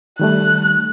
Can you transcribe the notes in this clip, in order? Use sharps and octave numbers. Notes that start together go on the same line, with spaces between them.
D#3 G3 A3 F#6